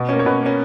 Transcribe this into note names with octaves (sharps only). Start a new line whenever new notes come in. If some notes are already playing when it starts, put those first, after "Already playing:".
Already playing: B2
A#3 C#4
C#5
B2 B4
A#3 C#4